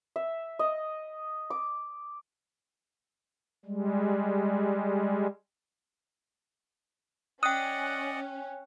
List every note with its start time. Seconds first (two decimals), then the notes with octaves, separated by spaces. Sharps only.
0.16 E5
0.59 D#5
1.50 D6
3.65 G3 G#3
7.43 C#4 D5 D#5 F#5 G5 D#6 F#6